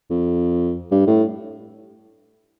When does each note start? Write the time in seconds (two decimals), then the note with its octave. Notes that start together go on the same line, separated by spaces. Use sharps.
0.10 F2
0.91 G2
1.07 A2